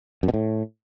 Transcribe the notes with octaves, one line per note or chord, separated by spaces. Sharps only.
F#2
B2
A2